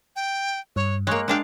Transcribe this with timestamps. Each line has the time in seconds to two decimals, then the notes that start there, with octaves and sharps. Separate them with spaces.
0.16 G5
0.76 G2 C#5
1.07 G#3 A#3 C#5 F#6
1.28 G#3 D4 F5 G5